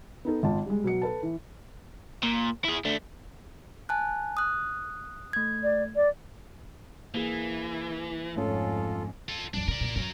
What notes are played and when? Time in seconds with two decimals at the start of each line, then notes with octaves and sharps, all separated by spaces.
0.25 B3 D#4 A4
0.43 G#1 F4 A5
0.66 G3 G#3
0.83 B2 F#3 C#7
1.02 A4 B4 A5
1.23 E3
2.23 A#2
2.64 E4 G#4
2.85 A3 D4
3.89 G#5 A5 F#6
4.37 D#6 F#6
5.33 A3 G#6
5.63 D5
5.96 D5
7.14 E3 A#3 G#4
8.36 F2 G#2 A3 C#4 F4 A4
9.28 F4 A4
9.54 F2 F#3 D4
9.68 C#3 A#4 D5
9.81 F#1 A#2
9.96 F#2 F#3 A#4